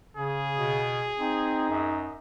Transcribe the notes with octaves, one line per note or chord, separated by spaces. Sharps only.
C#3 G#4
B2
C4 D#4
F#2